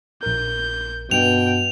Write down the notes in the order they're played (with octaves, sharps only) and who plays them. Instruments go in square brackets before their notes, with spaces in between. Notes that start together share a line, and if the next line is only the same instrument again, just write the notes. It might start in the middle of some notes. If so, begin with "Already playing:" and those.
[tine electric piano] A#1 A#4 [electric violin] G6
[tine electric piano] G2 [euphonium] B2 [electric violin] G5 [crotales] F7